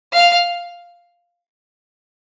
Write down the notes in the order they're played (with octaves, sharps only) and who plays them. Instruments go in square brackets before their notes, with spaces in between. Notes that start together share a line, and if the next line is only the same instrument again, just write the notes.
[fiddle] F5